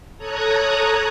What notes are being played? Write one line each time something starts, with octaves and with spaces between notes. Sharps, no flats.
A4 C#5 A#5 D#6 F#6 G#6